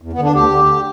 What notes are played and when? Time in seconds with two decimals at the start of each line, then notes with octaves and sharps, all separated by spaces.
0.02 E2
0.13 B3
0.18 D3
0.24 D4
0.34 D2 G4
0.51 D3